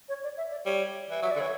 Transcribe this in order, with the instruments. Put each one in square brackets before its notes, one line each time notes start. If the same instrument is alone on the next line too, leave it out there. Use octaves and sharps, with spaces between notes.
[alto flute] C#5
D5
E5
D5
[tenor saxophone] G3 [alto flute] C#5
[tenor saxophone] E3
[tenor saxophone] F#3 [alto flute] E5
[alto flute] D5
[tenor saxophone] D3
[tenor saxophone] E3 [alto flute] C#5